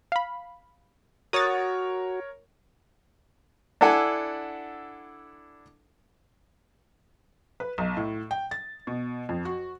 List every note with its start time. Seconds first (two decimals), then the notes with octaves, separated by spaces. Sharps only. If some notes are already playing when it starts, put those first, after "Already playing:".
0.12 F5 B5
1.33 F#4 A#4 C#5 D#6 A6
3.81 D4 E4 A4 F#5 G#5
7.60 B4
7.78 B1
7.97 A2
8.31 G5
8.51 A6
8.87 B2
9.29 F2
9.45 F#4